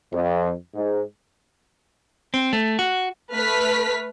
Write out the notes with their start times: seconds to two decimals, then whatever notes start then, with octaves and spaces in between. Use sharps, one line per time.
0.12 F2
0.74 G#2
2.34 C4
2.53 A3
2.79 F#4
3.32 A3 B4 F6 B6